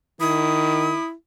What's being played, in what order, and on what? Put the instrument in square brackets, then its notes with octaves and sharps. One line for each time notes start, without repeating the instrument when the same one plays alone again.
[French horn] D#3 [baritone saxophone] E4 [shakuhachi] D#6